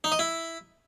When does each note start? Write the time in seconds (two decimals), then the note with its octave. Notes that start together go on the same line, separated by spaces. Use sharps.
0.04 D#4
0.12 D#5
0.19 E4